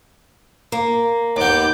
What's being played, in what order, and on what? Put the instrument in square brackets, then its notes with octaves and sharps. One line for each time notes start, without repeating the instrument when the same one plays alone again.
[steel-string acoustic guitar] A#3
[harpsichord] D#2 B3 [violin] D6 G6